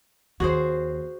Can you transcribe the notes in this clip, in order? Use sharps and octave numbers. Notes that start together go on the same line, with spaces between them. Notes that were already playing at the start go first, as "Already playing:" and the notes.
D#2 F#4 G#4 C5